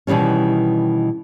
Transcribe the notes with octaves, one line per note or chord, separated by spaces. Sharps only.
B2 D#3 E3 G3 C#4